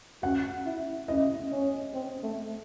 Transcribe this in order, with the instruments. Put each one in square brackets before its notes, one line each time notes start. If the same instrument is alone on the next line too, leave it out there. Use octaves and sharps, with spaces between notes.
[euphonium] F#4 [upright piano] F#5
[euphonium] E4
[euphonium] E4 [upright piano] D#5
[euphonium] C#4
C4
A3